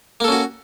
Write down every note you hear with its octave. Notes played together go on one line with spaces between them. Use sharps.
A#3 C#4 F#4 A4